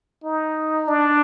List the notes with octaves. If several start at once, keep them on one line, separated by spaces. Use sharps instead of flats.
D#4
D4